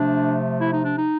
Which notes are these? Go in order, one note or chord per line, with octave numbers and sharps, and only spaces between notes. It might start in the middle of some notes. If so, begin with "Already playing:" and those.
Already playing: C3 F3 A3 D4
E4
D#4
D4
D#4